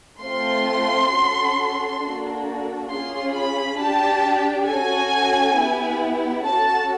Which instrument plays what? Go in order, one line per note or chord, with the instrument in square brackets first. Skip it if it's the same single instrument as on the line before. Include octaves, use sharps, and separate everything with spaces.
[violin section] A3 C4 F4 C6
C#4 F#4 A4
A#3 D4 F#4 A4
C#4 F4 G#4 C6
B5
D4 G4 A5
C#4 F#4 A4 G#5
B3 E4 G4
C#4 F#4 A4 A5